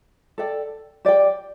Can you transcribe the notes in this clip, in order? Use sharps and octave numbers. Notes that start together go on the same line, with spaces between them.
A4 D5 G5
G4 D5 G5